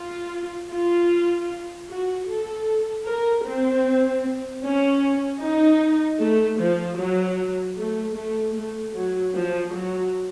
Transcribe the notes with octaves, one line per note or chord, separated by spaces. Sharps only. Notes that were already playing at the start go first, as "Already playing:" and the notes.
Already playing: F4
F4
F#4
A4
A#4
C4
C#4
D#4
A3
F3
F#3
A3
A3
A3
F#3
F3
F#3